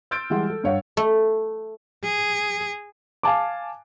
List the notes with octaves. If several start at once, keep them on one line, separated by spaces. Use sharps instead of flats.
C6 E6 F6 G6 A6 D7
E3 G3 G#3 G#4 F#5 C6
A4
G2 C#5 F5 F#5
A3
G#4
F5 G#5 A5 D6